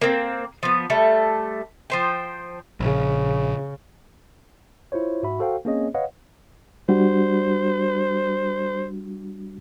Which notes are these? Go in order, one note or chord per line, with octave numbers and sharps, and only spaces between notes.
A#3 C4
F3 B3
G3 A3 A4
F3 C5 G5
A#1 C#3
E4 F4 C5 C#5
G#2 F#4 E5 B5
F#4 A4 C5 F5 G5
A#3 C4 C#4 G#4 C#5 D#5
B4 C#5 D#5 F5 F#5
G3 D4 F#4 C5